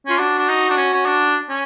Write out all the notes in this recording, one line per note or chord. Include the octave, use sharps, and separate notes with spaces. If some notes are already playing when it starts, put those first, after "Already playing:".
C#4 F4
D4 F#4
D4
D#4
D4
C#4
C#4
D4
C#4